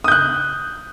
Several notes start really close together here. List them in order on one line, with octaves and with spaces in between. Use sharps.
D#6 G6 F#6